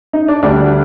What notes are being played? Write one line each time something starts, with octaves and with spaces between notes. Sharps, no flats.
D#4
D4
D2 D3 G3 D4